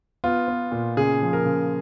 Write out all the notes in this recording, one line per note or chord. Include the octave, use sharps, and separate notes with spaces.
B3 F4
B3
A#2
C#3 G#4
F3
A#4
C#3